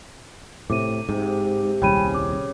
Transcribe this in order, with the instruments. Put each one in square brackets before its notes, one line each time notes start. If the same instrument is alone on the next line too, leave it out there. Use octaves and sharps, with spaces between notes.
[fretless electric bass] A2 C3 [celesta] D6 D#7
[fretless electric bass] G#2 [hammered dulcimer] C3
[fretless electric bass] D#1 C2 [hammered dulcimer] C#3 [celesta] G5 B5 D#7
[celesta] D6